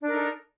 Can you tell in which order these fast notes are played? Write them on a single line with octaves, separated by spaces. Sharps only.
D4 A#4 D#4 A4